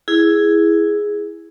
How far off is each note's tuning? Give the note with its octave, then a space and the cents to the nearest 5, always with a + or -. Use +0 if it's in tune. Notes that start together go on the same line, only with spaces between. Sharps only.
E4 +0 G#4 +0